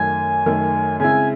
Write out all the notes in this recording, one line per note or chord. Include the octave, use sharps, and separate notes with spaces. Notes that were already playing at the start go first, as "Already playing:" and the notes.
Already playing: F#2 D#3 A3 G#5
F#2 D#3 A3
C#3 G#3 C4 E4 G#5